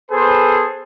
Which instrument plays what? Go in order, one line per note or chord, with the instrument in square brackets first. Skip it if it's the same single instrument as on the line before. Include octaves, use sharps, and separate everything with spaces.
[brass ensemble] B3 G#4 A4 B4 C5